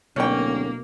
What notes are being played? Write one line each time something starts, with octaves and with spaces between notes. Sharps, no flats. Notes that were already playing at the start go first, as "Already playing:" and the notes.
D1 B2 A#3 C#4 G5